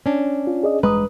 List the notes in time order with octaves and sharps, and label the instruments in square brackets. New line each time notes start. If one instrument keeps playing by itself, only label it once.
[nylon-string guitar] C#4 D4
[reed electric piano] F4
G#4 D5 D#5
[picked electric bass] A1 G2 G#3 [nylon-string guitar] B4 [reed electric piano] A#5 D#6